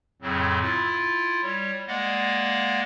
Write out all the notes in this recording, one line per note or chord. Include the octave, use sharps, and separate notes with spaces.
F2 A2 C#3 F#3 C4
E4 F4
G3 C#5
G#3 A#3 D5 D#5 F5 F#5